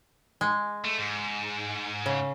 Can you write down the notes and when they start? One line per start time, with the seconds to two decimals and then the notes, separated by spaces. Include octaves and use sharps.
0.41 G#3
0.84 A3
0.98 G#2
2.06 C#3